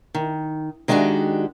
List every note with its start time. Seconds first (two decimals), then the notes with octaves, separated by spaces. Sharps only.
0.15 D#3
0.88 D#3 G#3 D4 D#4 F#4 G4